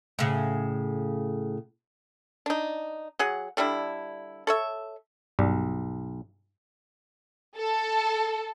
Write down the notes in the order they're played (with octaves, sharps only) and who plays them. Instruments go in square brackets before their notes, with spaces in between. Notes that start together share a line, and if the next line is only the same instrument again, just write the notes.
[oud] A2 C#3
[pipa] D4 D#4
F#3 G#4 F#5
D3 G3 D4 E4
A4 C#5 E5
[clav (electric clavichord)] B1 [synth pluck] G2
[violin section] A4